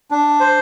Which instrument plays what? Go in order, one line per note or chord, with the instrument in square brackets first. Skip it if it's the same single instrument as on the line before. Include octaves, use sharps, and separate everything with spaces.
[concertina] D4
C5